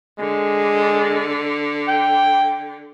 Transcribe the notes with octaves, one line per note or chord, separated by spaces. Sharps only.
D3 G#3
G5